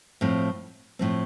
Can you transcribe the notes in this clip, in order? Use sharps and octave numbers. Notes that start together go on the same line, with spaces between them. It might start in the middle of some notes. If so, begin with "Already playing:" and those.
A2 F3 C4
A2 F3 C4